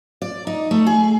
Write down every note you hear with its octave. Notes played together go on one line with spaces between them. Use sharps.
D5
D#4
A3
G#4